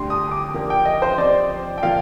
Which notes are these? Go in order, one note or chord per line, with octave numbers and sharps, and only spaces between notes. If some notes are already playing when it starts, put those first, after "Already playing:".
Already playing: D2 D3 G3 D4 G4 C6
D#6
D6
F3 A#3 D4 G4 A#4
G5
D#5
C5
F3 C4 G4 C5 D5 D#5
G5
A#2 F3 A#3 F4 F5